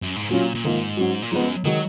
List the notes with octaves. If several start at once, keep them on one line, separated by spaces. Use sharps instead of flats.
F#2
G#2
A#2 F#3 C#4 F4
A#2
G#2 D#3 A#3 F4
F#3 C#4 F#4
A#2
G#2 F3 G#3 B3
F#2
D#3 F#3 G#3 D#4 F#4